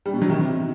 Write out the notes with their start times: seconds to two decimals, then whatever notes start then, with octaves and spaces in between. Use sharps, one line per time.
0.06 G3
0.14 B2
0.22 F#3
0.30 D#3
0.38 C3